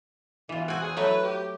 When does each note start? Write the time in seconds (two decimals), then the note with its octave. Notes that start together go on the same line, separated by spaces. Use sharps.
0.49 B2 E3 F4
0.68 C4 F#4 A4 F#5 G#5
0.82 E2 G#4
0.97 F#3 A3 E4 B4
1.23 G4